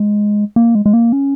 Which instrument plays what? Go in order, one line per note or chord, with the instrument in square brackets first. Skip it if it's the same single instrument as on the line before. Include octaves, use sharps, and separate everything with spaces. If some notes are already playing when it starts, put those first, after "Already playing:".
Already playing: [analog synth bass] G#3
A#3
G#3
G#3
A#3
C#4